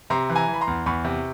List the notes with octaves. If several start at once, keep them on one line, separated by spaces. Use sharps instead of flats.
C3 A#5 C6
E3
G#5 A#5
E3
B5
A#5 C6
E2
E2 B5 C#6
C3